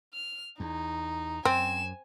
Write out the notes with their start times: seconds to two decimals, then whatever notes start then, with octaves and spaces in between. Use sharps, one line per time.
0.13 F6
0.60 E2 D#4
1.45 F#2 C4 G#5 E7